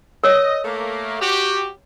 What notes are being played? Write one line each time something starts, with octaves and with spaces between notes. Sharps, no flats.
A#4 C#5 D#5
A3 A#3
F#4 G4